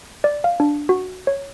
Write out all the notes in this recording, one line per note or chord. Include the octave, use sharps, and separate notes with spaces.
D5
F5
D4
F#4
C#5